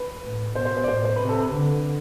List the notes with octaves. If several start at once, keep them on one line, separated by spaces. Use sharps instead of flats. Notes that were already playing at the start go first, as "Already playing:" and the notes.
Already playing: B4
A2
B2 C5
C5
C5
D5
A2 C5
C5
C3 B4
A4
B4
D3